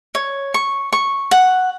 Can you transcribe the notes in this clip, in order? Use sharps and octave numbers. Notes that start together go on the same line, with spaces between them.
C#5
C#6
C#6
F#5